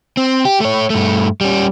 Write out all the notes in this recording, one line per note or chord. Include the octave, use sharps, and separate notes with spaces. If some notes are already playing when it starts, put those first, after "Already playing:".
C4
G4
A3 C#5
G2 A3
G3 C#4